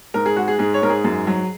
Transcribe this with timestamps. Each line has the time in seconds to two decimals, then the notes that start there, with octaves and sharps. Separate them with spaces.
0.14 G#2 A#4
0.26 G#4
0.36 G#3 F#4
0.48 G#4
0.59 G#2 G#4
0.74 C#5
0.82 G#2 A#4
0.90 G#4
1.04 F#2
1.27 F#3